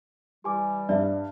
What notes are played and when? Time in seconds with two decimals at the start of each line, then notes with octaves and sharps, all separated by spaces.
0.44 E3 G3 G4 G#5 D6
0.89 G2 D5 E5